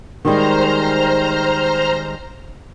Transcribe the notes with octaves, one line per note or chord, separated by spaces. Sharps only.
D#3 G3 G#3 C5 A#5 F6